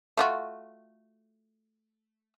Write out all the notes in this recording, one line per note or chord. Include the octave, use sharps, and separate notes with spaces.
A3 F4 F#4